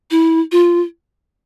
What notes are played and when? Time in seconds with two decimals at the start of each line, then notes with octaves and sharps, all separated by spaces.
0.11 E4
0.52 F4